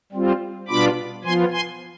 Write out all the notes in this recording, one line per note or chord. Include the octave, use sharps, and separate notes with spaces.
G3 C4 F4
B2 G3 B3 D4 F4 B5 D6
F3 B3 F4 G#5 C6
G#5 C6